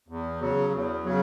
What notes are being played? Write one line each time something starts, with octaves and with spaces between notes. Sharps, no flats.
E2
C#3 F#3
E2
C#3 F#3